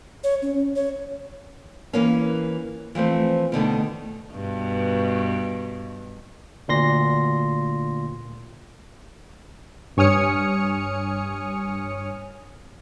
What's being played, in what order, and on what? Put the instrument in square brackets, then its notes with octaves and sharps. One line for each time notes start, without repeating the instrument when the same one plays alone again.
[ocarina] C#5
C#4
C#5
[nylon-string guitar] E3 A#3 C#4
E3 F3 A3 C4
B2 D3 D#3 A3
[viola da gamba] G2 B2
[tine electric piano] D2 A#2 C6 A#6
[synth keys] G2 C#5 G#5 D#6 F6 C#7